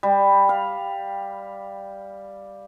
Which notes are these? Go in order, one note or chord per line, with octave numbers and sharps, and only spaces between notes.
G3
F5